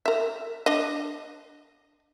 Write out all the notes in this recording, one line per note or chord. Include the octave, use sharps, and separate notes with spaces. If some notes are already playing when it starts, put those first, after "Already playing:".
A#4 E5
D4 D#5